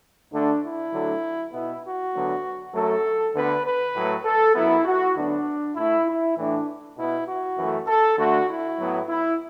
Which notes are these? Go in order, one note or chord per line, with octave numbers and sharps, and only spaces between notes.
D2 D3 A3 D4
E4
D2 D3 F#3 A3
B2 B3 E4
F#4
D2 D3 F#3 B3
F#2 F#3 A3 A4
D2 D3 B3 B4
B4
A2 F#3 A3
A4
F#2 F#3 B3 E4
F#4
D2 D3 F#3 B3 D4
A2 A3 E4
E4
A2 E3 A3 D4
B2 B3 E4
F#4
F#2 E3 A3
A4
D2 D3 A3 F#4
E4
A2 F#3 B3
E4